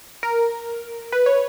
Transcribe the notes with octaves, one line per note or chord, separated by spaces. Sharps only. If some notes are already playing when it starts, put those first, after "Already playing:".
A#4
B4
C#5